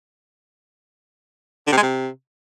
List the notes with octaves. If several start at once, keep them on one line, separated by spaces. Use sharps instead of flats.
D3
C3
G#3
C3